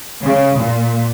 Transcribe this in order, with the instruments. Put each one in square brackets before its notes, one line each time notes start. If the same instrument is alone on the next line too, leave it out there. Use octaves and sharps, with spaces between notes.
[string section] C#3
A#2